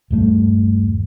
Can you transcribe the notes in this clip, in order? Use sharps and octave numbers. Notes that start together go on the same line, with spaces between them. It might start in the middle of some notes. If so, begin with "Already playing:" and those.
D#1 G2 A3